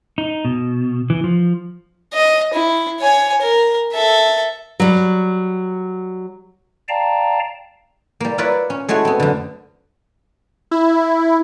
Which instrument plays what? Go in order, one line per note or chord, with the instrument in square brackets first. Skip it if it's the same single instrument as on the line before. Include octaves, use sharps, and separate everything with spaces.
[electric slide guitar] D#4
B2
E3
F3
[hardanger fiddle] D#5
E4
C#5 G#5
A#4
A4 E5
[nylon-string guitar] F#3 G3
[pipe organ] D5 F5 G5 A5 A#5
[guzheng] G3 A#3
F4 A#4 B4 C#5 D5 E5
C#4
G#3 A3 E4 F#4 C#5
B3 C4
F#2 D3
[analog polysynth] E4